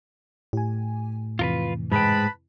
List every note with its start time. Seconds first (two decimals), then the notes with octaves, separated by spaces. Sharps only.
0.53 A2 G4 G#5
1.39 F2 C3 E3 F4 A#4 B4
1.92 G#2 G#3 B4 G5 A5 B5